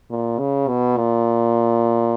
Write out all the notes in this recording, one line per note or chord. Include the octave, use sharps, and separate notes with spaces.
A#2
C#3
B2
A#2